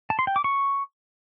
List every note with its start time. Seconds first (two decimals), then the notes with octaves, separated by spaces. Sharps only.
0.10 A5
0.19 C6
0.27 G5
0.36 D6
0.44 C#6